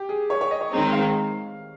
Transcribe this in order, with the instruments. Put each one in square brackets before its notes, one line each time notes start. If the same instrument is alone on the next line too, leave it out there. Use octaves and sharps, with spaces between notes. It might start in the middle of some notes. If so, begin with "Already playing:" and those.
Already playing: [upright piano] G4
G#4
C#5
C#5
D#5
C#5
[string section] D#3 G#3 C4 D#4
[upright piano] F5